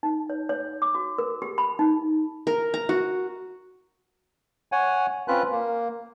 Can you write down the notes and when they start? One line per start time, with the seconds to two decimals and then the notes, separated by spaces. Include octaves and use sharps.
0.03 D#4
0.30 C#5
0.49 C#5
0.82 D6
0.95 F#4
1.18 A#4
1.42 G4
1.58 B5
1.79 D#4
2.47 A#4
2.74 A#5
2.89 F#4
4.72 C#5 F#5 G#5
5.28 C4 C#4 F4 B4 F#6
5.51 A#3